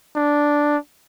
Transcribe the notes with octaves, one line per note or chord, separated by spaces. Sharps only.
D4